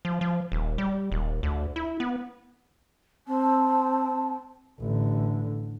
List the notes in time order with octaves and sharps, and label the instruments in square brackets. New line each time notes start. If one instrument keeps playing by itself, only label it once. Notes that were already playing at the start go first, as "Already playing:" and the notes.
[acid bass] F3
F3
D#1
G3
D#1
D2
E4
B3
[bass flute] C4 [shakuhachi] A5
[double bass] A1 D3